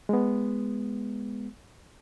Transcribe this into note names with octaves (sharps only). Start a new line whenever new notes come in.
G#3 B3